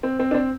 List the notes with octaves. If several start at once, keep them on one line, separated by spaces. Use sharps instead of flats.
C4
C4
D4
C4